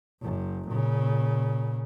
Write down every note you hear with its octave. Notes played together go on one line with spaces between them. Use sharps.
F#1 F#2
A#2 C#3